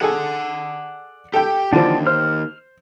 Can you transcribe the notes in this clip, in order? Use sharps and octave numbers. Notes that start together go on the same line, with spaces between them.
G#4 A4 D5 F#5 G#5
G4 A4 G5
D#2 D3 E3 F3 D4
C5 F6